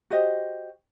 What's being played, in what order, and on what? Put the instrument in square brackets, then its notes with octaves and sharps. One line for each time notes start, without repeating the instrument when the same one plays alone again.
[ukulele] F#4 G4 C5 D#5